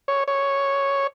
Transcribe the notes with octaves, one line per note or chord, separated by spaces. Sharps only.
C#5
C#5